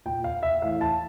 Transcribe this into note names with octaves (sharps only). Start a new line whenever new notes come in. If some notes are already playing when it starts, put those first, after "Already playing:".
A#2 G5
F5
E5
A2 E3 F5
A5